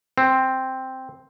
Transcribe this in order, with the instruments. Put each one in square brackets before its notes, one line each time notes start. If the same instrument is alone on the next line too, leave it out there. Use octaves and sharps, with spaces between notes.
[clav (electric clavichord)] C4